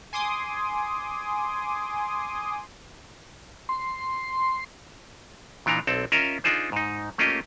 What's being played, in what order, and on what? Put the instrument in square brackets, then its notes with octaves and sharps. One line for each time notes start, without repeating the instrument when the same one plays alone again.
[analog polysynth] G#5 C6 D6 D#6
[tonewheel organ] C6
[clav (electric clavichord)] A#2 E3 D4 D#4 A#5
B1 C4 A4
C#4 F4 A#4 D#5 E5 A#5
D4 D#4 F4 G#4 C5
G#2 D#4
A3 A#3 C#4 F4 G4 D#5